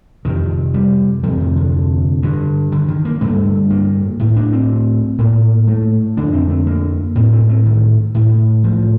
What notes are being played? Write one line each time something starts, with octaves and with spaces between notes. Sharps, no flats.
F2 C3 D#3
G3
F2 C3 F3
D#3
D3
G2 D3
D3
D#3
A#3
G2 D3 A3
A#3
A2
D4
C4
A2 A#3
A3
F2 D3 D4
C4
A3
A#3
A2 C4
C4
A3
D#3
A2
F3